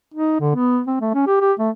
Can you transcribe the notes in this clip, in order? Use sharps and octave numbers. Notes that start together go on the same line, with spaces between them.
D#4
D3
B3
C4
A3
C#4
G4
G4
A3